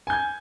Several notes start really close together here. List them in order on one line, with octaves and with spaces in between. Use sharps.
G#5 G6 G#6